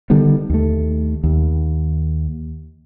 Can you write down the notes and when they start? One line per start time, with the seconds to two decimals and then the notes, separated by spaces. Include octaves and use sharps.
0.10 D3 D#3 G3 B3
0.50 D#2 A3
1.24 D#2